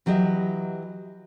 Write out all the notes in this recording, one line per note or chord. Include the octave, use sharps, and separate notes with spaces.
E3 F#3 G4 D#5 E5